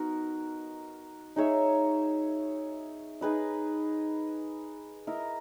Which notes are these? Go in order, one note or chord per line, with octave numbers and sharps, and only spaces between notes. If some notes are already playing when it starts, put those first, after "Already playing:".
Already playing: B3 D#4 F#4 A#4
D#4 G#4 C#5 E5
D#4 G#4 B4 D#5
E4 A#4 D#5